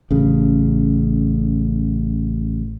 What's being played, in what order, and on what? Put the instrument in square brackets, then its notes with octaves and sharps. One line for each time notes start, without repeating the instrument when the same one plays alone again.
[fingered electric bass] A1 C#3